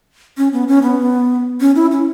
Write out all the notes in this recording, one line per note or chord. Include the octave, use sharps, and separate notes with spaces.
C#4
B3
C#4
B3
C#4
E4
C#4